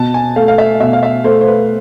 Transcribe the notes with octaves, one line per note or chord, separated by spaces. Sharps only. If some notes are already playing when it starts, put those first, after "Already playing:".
Already playing: B2 A5
G#5
A3 F5
F5
E5
B2 E5
F5
E5
A3 C5
C5
B4